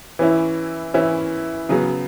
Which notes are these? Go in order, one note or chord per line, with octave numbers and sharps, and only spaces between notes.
E3 C#4 E4
E3 C#4 E4
C#3 F#3 B3